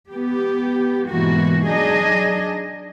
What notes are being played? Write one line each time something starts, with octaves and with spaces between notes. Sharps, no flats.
B3 G4
G#2 B2 E3 A#3 F#4
F#3 D4 D#4 G#4 D#5